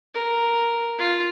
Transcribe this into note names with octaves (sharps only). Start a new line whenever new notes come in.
A#4
F4